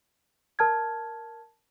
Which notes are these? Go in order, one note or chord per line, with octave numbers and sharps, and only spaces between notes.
A#4 A5 F6 G#6